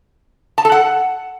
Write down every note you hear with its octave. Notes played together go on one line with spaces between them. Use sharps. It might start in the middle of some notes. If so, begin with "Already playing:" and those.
A5
A4
F#5